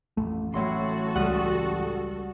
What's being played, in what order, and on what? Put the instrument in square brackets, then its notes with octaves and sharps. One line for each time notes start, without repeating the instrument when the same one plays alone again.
[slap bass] A1 F2 [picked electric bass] A3
[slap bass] A1 [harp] A2 F#3 C6 [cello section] F#4 A4
[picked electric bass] C#2 [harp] G3 F#5 D#6